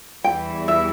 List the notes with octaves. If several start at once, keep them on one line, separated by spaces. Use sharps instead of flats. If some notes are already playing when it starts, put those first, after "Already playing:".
E2 E3 G3 E4 G5
E5